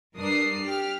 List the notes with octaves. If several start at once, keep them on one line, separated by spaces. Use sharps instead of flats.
G2 D4 A#4 D#6 C7
G4 F6